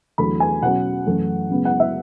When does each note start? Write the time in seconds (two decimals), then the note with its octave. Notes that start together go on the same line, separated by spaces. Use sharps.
0.18 E2 D3 F#3 A3 E4 B5
0.40 G#5
0.62 B2 F#3 C#4 F#5
1.07 F#2 E3 A3 E4
1.50 F#2 C#3 G#3 B3
1.65 F#5
1.80 E5